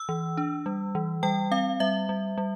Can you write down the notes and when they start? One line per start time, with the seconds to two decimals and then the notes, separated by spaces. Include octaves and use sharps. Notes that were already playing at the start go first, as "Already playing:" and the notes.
Already playing: E6
0.09 E3
0.37 D4
0.66 G3
0.95 E3
1.23 G3 G5
1.51 C4 F5
1.80 G3 E5
2.09 G3
2.38 G3